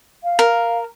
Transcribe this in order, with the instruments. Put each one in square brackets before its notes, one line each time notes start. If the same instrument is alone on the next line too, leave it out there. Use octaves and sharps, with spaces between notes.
[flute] F5
[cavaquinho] A#4